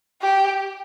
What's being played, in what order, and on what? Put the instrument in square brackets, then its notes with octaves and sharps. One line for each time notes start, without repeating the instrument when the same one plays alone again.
[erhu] G4